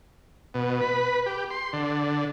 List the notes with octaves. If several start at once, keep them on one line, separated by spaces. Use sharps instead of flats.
B2
B4
G4
C6
D3